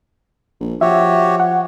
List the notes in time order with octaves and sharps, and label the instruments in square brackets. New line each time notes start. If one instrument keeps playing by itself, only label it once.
[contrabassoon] A#1
[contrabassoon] F3 [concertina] F#4 G4 C#5 [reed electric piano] E5
[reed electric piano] F#5